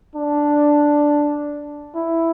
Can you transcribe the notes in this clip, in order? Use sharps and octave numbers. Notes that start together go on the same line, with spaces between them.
D4
E4